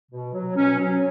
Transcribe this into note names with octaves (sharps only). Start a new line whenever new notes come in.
B2
F#3
B2 C#4
F#3